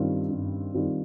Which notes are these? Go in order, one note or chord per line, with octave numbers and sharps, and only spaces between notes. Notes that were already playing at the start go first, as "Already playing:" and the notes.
Already playing: G2 D#3 G3 C4 F4
G2
D#3 G3 C4 F4